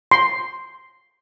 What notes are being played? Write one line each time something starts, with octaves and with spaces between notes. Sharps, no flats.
C6